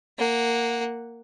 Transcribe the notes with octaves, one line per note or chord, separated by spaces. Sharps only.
A#3 F#5